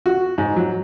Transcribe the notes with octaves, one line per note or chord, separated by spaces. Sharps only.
F#4
G#2
F#3